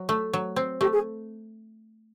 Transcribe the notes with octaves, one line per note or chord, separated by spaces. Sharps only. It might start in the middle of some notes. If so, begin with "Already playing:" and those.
Already playing: F#3
A3
F#3
C4
A3 G4
G#4